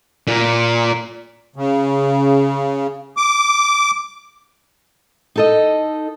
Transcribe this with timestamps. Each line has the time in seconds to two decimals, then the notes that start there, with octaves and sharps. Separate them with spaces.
0.27 A#2
1.56 C#3
3.17 D6
5.36 D#4 A4 D#5